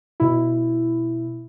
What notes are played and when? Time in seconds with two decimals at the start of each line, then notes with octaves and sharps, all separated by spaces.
0.20 B2 E4